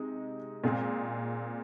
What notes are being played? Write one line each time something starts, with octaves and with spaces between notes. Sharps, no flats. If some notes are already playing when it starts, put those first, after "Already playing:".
Already playing: C3 G#3 D#4
A#2 G#3 C4 G#4